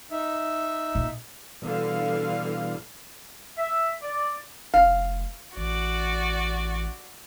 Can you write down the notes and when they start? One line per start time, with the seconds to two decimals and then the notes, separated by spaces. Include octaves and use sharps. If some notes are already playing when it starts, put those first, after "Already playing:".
0.11 D#4 E5
0.95 A#2
1.62 B2 D3 E3 G3 F5
3.57 E5
4.02 D5
4.74 F1 F5
5.57 A1 F#4 D5